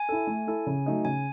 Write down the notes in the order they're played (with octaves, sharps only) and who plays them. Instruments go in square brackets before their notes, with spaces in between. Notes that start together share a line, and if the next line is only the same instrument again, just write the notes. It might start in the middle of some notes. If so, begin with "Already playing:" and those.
Already playing: [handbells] G#5
[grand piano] E4 A4
A3
E4 A4
C#3
F#3 A3 D#4
[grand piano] C#3 [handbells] G#5